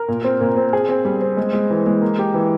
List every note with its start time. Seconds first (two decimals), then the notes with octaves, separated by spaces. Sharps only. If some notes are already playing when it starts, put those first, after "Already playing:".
Already playing: A#4
0.08 A#2
0.24 C4
0.41 A#2
0.57 C4
0.73 G#4
0.89 C4
1.05 G3
1.22 C4
1.37 G#3
1.53 G#3
1.70 E3
1.86 G#3
2.01 A#3
2.19 G4
2.34 E3